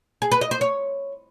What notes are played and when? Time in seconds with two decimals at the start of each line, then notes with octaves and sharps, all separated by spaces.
0.22 G#4
0.32 B4
0.41 D#5
0.51 C5
0.61 C#5